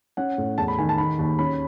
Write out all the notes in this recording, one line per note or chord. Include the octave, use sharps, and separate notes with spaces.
C#4 F#5
A2
E2 A5
B5
D#3 G#5
A5
D#3 B5
D#2
C#4 B5